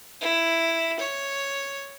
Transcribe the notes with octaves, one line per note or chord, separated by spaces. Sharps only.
E4
C#5